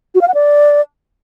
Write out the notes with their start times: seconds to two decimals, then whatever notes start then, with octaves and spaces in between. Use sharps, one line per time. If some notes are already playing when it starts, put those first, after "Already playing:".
0.15 F#4
0.21 F5
0.28 F#5
0.34 D5